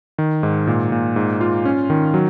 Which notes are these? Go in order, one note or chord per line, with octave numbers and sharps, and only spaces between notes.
D#3
G#2
A#2
A#2
G#2
F4
C#4
D#3
F#3